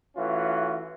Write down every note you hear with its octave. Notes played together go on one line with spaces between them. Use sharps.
E3 A3 C#4 F4 F#4